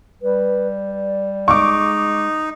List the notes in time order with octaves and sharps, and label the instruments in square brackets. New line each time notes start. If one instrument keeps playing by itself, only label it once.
[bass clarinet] G3 [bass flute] B4
[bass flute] D5
[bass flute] G#3 [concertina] D#4 [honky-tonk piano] C#6 D6